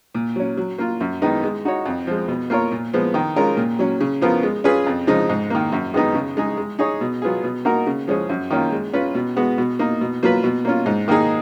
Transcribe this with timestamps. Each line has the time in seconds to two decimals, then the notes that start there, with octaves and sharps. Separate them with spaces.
0.15 A#2
0.36 F#3 C#4
0.57 F#3
0.78 A#3 F4
1.00 F#2
1.22 D#3 G#3 B3 D#4
1.44 G#3
1.65 D#4 F#4 C#5
1.86 F2
2.07 F3 G#3
2.28 B2
2.50 A#3 F4 A#4 C#5
2.71 A#2
2.94 F3 G#3 B3
3.14 D#3
3.36 G#3 C#4 F4 A#4
3.57 A#2
3.79 F#3 C#4
4.00 C#3
4.21 F3 B3 F4 A#4
4.43 G#3
4.64 C#4 F4 G#4 B4
4.87 F2
5.07 C#3 F3 G#3 D#4
5.29 G#2
5.50 D#3 A#3
5.72 F#2
5.94 D#3 G#3 B3 D#4
6.15 C#3
6.37 G#3 D#4 G#4
6.57 G#3
6.79 D#4 G#4 C#5
7.01 B2
7.22 F#3 B3 F4 G#4
7.44 B2
7.65 A#3 D#4 F#4 A#4
7.87 C#3
8.08 F3 G#3 C#4 G#4
8.29 F#2
8.51 D#3 A#3 C#4 F4
8.72 G#3
8.93 C#4 F4 B4
9.15 B2
9.36 G#3 B3 F#4
9.58 B2
9.79 A#3 D#4
10.01 B2
10.23 F#3 A#3 F4 B4
10.44 B2
10.65 A#3 C#4 F4
10.86 G#2
11.08 D#3 A#3 D#4 G#4